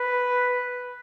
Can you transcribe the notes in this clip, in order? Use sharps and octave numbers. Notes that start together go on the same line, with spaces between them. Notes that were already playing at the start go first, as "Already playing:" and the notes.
Already playing: B4